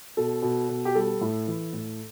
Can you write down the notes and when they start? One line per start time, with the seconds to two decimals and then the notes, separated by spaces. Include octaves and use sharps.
0.17 B2 A4
0.42 B2
0.69 B2
0.85 G4
0.95 G3 A4
1.21 A2
1.47 E3
1.73 A2